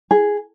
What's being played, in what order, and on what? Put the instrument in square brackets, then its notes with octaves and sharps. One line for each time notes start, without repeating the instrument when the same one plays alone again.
[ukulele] G#4